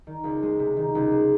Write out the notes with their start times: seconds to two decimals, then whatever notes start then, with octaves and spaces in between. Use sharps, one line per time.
0.07 D#3
0.24 C#2
0.43 G#3
0.59 C3
0.77 D#3
0.95 C#2
1.12 G#3